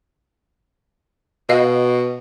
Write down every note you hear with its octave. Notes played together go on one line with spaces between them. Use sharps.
B2 D#5 F5